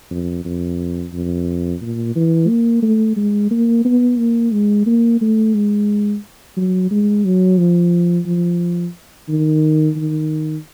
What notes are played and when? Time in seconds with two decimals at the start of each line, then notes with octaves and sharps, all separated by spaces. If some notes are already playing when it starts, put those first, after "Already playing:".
0.11 F2
0.45 F2
1.13 F2
1.82 A#2
2.16 E3
2.49 A#3
2.83 A3
3.17 G#3
3.51 A#3
3.85 B3
4.19 A#3
4.52 G#3
4.87 A#3
5.21 A3
5.55 G#3
6.57 F#3
6.91 G#3
7.25 F#3
7.58 F3
8.26 F3
9.29 D#3
9.96 D#3